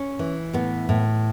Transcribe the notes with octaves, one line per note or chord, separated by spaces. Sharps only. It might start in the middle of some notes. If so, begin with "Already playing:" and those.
Already playing: C#4
E3
A2 B3
A2